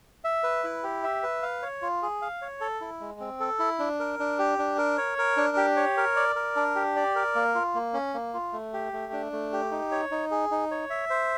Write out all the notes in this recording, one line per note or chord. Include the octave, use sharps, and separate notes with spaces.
E5
B4
E4
G4
E5
B4
F5
C#5
F4
G#4
F5
C#5
A4
E4
G#3
C4
A4
E4
D4
A#4
D4
G4
D4
A#4
C#5
A#4
D4
G4
C#5
A#4
D5
A#4
D4
G4
D5
A#4
A#3
F4
A#3
C#4
A#3
F4
A3
G4
A3
D4
A3
G4
D#4
C#5
D#4
G#4
D#4
C#5
E5
C5